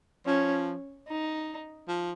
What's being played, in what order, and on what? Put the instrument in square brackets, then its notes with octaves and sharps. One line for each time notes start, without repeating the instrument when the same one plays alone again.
[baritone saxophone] F3 [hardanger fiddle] C#4
[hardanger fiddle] D#4
[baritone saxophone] F3